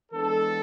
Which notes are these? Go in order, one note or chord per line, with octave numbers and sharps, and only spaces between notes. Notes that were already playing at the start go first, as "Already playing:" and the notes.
E3 G#3 B3 D4 A4